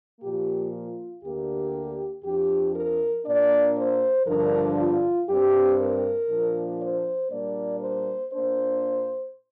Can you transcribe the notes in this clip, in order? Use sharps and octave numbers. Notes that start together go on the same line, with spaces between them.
A#2 F3 A#3 G4
F4
D2 D3 A#3 D4 G4
F2 F3 D4 G4
A#4
A#2 A#3 D4 D5
C5
G2 D3 F3 D4 A#4
F4
G2 G3 C4 G4
A#4
A#2 F3 A#3 D4
C5
A#2 G3 A#3 D4 D5
C5
A#2 A#3 D4 C5